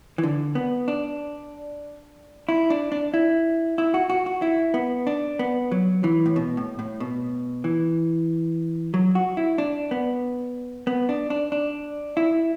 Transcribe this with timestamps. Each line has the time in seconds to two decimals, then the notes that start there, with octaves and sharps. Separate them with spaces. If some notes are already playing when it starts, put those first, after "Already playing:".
0.18 E3
0.23 D3
0.55 B3
0.88 D4
2.49 E4
2.70 D4
2.92 D4
3.14 E4
3.78 E4
3.94 F#4
4.10 F#4
4.26 F#4
4.42 E4
4.74 B3
5.07 D4
5.39 B3
5.71 F#3
6.04 E3
6.26 A2
6.36 B2
6.57 A2
6.79 A2
7.00 B2
7.64 E3
8.94 F#3
9.15 F#4
9.37 E4
9.58 D4
9.91 B3
10.87 B3
11.09 D4
11.30 D4
11.52 D4
12.17 E4